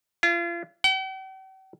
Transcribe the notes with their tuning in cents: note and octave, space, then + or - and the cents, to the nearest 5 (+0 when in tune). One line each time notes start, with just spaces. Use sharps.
F4 -35
G5 -45